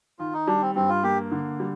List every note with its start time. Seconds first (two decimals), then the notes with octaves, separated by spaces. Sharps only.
0.19 D#3 F4
0.33 D#4
0.47 G3 D4
0.62 C4
0.75 G2 C4
0.89 F4
1.04 A#3 G4
1.31 D3
1.60 G3